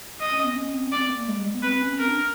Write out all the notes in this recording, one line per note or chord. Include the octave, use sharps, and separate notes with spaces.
D#5
C#4
B3
C#4
C4
C#4
C4 D5
A#3
G#3
G3
G#3
B3
C4 B4
C#4
C#4
C4 A#4
D4